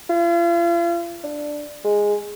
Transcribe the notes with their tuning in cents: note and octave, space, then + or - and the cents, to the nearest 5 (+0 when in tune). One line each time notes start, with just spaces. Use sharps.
F4 -40
D4 +5
G#3 -5